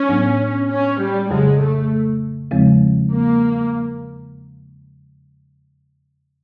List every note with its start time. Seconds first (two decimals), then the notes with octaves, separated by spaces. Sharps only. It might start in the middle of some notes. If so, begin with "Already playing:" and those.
Already playing: C#4
0.09 A2 F#3 B3 D4
0.71 C#4
1.01 G3
1.30 F2 C#3 F#3 G#3
1.61 A3
2.51 E2 C#3 F3 G#3 C4
3.12 A#3